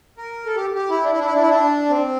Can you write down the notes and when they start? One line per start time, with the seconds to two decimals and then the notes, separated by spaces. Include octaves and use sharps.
0.18 A#4
0.46 A4
0.56 G4
0.75 G4
0.90 E4
1.03 D4
1.12 E4
1.19 D4
1.26 E4
1.35 D4
1.42 E4
1.49 D4
1.90 C4